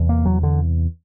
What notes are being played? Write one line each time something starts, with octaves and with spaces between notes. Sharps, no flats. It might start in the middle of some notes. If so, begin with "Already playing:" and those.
Already playing: E2 C3
A#3
F#3
D3